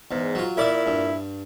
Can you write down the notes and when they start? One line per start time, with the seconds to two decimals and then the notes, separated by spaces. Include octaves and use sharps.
0.11 E2 G#2
0.35 F#3 F4
0.57 A#2 E4 A#4 D5 E5
0.87 G2